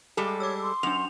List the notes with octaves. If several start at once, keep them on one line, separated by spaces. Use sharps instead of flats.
G3 G#3 G4 A4
C#5 D6 E6
C6
F#2 D4 F7